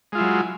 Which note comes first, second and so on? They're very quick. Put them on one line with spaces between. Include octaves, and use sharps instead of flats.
G#3 F4 E4 F#3